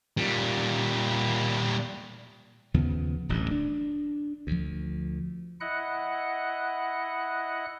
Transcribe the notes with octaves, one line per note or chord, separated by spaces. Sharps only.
A#2 G3
D#2 C#3 F3 B3
D1 A1 D2 G2
D4
D2 F3
E4 D#5 F#5 F#6